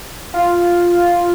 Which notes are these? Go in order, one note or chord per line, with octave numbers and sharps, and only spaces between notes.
F4